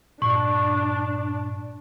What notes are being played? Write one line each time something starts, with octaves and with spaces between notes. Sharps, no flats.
G2 A#2 D4 C#6